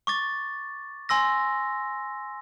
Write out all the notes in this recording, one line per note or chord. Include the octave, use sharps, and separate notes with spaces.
C#6 D6 A6
G#5 C6 E6 A#6